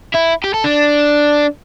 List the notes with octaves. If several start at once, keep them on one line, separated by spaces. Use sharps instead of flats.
E4
G4
A4
D4